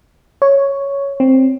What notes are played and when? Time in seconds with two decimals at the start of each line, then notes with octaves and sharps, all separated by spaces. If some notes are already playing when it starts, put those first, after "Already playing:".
0.42 C#5
1.20 C4